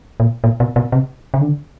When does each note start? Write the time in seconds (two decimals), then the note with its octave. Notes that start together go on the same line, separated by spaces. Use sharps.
0.20 A#2
0.44 A#2
0.60 B2
0.76 B2
0.92 C3
1.34 C#3
1.41 D3